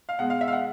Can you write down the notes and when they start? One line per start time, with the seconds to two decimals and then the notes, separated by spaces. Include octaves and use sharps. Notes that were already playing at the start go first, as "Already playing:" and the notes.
0.09 F5
0.19 B2 G#3 F#5
0.30 F5
0.41 E5
0.48 F5
0.53 F#5